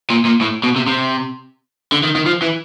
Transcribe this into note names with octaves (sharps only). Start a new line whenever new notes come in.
A#2
A#2
A2
B2
C3
C3
D3
D#3
D#3
F3
E3